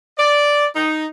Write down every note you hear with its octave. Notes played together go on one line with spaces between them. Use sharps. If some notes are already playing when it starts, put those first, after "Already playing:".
D5
D#4